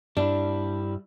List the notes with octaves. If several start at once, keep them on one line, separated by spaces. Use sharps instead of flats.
G2 G3 D4 E4